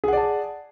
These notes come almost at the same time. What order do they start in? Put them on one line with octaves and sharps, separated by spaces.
G#4 F#5 D5 A5